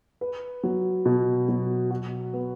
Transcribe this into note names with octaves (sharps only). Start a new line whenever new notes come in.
B4
F#3
B2
F#3
F#4
B3